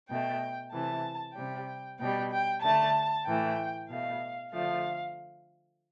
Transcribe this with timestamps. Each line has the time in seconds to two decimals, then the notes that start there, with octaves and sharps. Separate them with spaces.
0.09 B2 A3 G5
0.73 C3 E3 A3 A5
1.36 C3 G3 G5
1.99 B2 G3 G5
2.32 G5
2.63 D3 A3 A5
3.26 A2 E3 A3 G5
3.89 B2 A3 F5
4.52 D3 F3 A3 F5